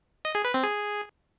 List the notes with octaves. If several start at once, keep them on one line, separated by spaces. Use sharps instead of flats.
D#5
G#4
B4
C4
G#4